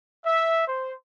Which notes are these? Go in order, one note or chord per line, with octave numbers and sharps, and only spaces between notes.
E5
C5